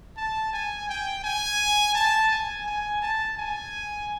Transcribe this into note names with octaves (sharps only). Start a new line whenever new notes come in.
A5
G#5
G5
G#5
A5
G#5
G#5
A5
G#5